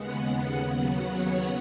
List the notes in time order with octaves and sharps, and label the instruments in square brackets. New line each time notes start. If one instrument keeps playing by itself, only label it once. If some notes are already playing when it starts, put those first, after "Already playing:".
Already playing: [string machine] D#2 C#3 G#3 B3 F#5
F#5
D#2 C#3 F#3 B3 F#5
C#5